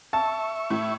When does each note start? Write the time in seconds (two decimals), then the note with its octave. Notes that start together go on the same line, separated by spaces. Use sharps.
0.13 E5 A5 C#6
0.70 A2 E4